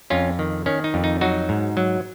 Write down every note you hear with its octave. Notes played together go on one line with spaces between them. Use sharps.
F2 C#4 F4
D#3
D#3 C#4
D#4
F2
D#4
F#3 D#4 F#4
G#2
F#3